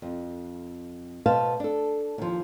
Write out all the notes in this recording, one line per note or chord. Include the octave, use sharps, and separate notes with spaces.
F2
B2 B4 C5 F5 A5
D4 A4
D#2 F3